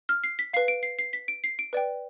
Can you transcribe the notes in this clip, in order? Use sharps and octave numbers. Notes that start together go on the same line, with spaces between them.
F6
C7
B6
B4 F5 C7
D7
C7
C7
B6
D7
C7
D7
B4 D5 G5